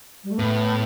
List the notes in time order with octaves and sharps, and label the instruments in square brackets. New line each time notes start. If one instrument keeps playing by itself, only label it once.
[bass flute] G3
A3
[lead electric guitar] A2 [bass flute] B3